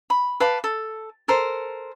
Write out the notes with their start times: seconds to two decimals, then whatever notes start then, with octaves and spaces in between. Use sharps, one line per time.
0.10 B5
0.40 B4 F5 A5 D6
0.64 A4
1.28 A4 A#4 C5